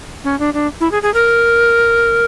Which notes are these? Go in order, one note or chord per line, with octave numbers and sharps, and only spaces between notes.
C#4
D4
D4
E4
G#4
G#4
A#4